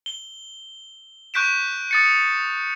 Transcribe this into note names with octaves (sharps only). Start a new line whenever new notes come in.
G7
C#6 F#6 G6 B6 D7 E7
D#6 A6 C#7